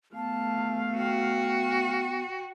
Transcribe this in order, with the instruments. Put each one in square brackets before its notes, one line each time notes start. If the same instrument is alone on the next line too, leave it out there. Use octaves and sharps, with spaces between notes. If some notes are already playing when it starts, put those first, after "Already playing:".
[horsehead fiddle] A3 F5 [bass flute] B3 [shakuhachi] A5
[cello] F#4 [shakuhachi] G5